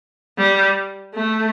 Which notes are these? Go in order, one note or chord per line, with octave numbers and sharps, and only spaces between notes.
G3
A3